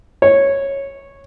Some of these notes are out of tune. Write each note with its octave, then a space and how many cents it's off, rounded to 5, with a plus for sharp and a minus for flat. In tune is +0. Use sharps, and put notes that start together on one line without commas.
C#5 -10